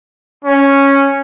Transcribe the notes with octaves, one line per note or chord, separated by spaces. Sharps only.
C#4